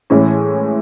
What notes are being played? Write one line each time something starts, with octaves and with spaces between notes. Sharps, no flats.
A2 E3 G#3 C#4